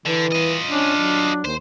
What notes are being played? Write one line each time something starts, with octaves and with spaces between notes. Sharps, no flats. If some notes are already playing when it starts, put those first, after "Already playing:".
D3 E3
F4 D#5
C#4 D4
F#3
D#2 C5